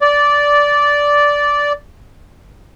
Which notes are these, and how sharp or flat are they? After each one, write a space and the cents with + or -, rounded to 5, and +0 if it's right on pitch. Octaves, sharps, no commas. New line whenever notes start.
D5 -10